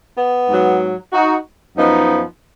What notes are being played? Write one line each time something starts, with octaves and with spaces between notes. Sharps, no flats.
B3
G#2 F#3
D#4 F#4
F#2 F3 B3 D#4